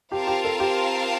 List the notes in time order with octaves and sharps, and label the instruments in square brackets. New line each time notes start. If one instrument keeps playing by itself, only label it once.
[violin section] C4 F4 A#4 F5 A5 [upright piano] G4
[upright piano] G4
A4
G4